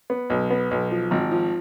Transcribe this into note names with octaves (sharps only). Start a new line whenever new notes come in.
B3
B1
B3
B1
F3
G#1
F3